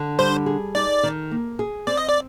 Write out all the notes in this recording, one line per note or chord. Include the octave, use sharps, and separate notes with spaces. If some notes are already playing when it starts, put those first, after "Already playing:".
Already playing: D3 D4
G3 C5
G#4
D#4 D5
D#3
A#3
G#4
C4 D5
D#5
D5